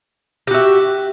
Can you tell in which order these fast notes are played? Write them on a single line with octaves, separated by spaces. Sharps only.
G4 F#4 E5